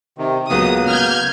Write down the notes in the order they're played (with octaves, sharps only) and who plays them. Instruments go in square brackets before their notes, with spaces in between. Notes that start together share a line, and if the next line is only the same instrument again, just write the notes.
[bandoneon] C3 D#3
[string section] C#2 D#6 [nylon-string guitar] C#3 F#3 B3 [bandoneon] A#3
[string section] F6 G6 G#6